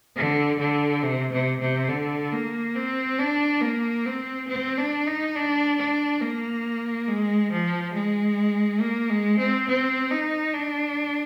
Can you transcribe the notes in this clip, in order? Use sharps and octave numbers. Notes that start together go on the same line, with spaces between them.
D3
D3
C3
C3
C3
D3
A#3
C4
D4
A#3
C4
C4
D4
D#4
D4
D4
A#3
G#3
F3
G#3
A#3
G#3
C4
C4
D#4
D4